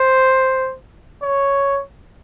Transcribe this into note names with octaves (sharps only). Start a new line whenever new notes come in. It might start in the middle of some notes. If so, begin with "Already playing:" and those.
Already playing: C5
C#5